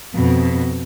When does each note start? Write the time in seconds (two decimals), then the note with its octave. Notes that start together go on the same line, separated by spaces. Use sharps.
0.15 F2 B2